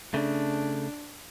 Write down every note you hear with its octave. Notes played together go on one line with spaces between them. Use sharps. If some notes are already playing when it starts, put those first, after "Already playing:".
C#3 A3 D4